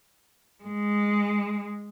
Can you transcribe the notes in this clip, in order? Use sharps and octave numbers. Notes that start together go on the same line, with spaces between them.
G#3